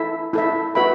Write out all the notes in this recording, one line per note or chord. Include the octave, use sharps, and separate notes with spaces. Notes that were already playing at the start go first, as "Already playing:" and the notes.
Already playing: E4 A4 E5
E4 A4 E5
F#4 B4 E5 B5